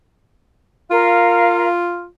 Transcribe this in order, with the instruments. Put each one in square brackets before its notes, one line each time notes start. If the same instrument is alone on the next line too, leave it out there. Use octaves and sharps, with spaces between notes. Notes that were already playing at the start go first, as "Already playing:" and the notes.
[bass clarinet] F4 [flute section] A#4 F5